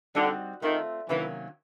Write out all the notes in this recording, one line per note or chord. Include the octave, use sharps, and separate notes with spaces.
D3 G3 C4 D#4 F#4
D#3 A3 C4 F4
C3 D#3 E3 F#3 A#3 C#4